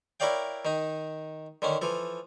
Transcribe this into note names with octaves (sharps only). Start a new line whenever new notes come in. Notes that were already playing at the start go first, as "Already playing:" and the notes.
E4 A#4 C#5 D5 F5 G5
D#3 D#4
D3 D#3 C#4
E3 F3 A4